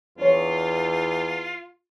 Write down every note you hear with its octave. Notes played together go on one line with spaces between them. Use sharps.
E2 D4 F4 C#5